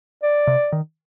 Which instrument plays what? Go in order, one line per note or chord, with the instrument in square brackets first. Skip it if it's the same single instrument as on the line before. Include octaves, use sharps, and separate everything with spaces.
[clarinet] D5
[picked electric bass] C3
D#3